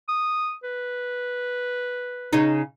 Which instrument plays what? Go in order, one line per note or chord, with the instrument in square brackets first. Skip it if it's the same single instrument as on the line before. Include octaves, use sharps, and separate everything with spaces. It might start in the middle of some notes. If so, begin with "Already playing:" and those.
[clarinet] D#6
B4
[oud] C#3 D#4